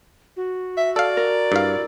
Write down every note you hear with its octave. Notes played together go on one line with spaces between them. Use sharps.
F#4
E5
A4 D5 F5
A#4
G2 E4 F5